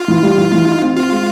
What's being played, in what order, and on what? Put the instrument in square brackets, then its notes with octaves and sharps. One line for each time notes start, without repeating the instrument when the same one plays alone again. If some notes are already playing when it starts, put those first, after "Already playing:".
Already playing: [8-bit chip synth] F4
[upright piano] E3
G3
E3
E3
D#4
C4
[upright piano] C4 [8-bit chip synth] F4
[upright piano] G#3